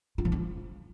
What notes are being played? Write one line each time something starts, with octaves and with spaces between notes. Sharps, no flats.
F4
F3
F4